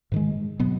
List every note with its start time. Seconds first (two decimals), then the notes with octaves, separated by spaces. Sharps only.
0.12 G#2 D#3 G#3
0.59 B2 F#3 B3